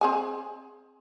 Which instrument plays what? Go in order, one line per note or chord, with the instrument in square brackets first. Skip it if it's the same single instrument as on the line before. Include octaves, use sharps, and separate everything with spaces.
[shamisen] C4 G#4 G#5